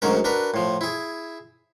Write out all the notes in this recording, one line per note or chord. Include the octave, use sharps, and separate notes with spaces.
D2 G#2 F#3 C#4 A#4
D4 F#4 A#4 B4
A2 F3
E4 G#4